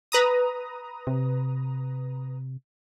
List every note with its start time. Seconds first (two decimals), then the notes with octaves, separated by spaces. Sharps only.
0.12 B4 A#5 D#6
1.07 C3